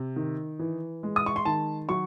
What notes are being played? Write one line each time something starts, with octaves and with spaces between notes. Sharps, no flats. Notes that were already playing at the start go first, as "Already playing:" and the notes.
Already playing: C3
D#3
E3
G#3
D#6
C#6
C6
D#3 A5
F#3 C#6